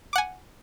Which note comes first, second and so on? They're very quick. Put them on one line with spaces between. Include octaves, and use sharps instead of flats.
D6 F#5 G#5